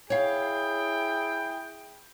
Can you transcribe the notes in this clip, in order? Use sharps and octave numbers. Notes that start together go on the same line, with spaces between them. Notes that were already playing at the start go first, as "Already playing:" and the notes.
E4 G#4 C#5 F5 G5